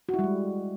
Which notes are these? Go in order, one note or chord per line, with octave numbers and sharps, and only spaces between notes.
F#4
E4
G3
G#3